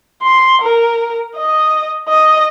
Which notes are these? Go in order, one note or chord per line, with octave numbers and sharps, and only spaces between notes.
C6
A#4
D#5
D#5